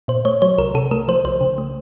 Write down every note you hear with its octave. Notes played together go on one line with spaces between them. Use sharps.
A#2 C5
A3 C#5
F#3 C#5
C2 A#4
C3 A4
A3 A#4
F3 C5
C2 C5
C#3
A3